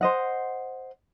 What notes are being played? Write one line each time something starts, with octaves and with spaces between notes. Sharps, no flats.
C5 D#5 F#5